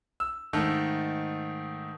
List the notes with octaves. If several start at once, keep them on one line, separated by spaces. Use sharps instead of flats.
E6
G#2 D#3 A3 A4